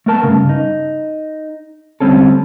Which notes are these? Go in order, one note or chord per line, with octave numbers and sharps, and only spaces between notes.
A3 B3 A#4 A5
G2 C#3
D#4
D2 G3 C4 C#4 A4